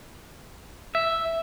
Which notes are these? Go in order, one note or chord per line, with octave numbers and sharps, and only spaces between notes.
E5